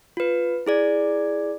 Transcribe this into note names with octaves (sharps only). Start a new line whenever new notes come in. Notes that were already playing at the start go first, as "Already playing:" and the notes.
F4 B4
E4 G#4 D5